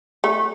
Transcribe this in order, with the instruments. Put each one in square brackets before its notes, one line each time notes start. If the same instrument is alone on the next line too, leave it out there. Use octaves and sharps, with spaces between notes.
[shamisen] A3